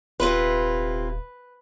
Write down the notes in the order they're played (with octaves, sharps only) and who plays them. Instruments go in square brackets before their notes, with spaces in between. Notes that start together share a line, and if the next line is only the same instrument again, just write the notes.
[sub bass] D#1 [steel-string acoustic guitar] C3 E4 F4 [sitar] B4